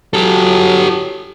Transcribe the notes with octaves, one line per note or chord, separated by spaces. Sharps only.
F#3 G4 A4